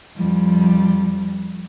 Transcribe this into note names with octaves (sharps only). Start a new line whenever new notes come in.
F2 G3